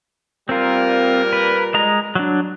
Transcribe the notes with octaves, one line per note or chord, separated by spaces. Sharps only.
A#2 G3 C4 F4 A#4
B4
G#3 D#5 A#5
F#3 D4